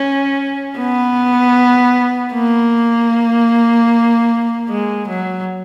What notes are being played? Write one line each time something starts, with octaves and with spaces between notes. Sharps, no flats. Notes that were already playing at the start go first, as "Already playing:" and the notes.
Already playing: C#4
B3
A#3
G#3
F#3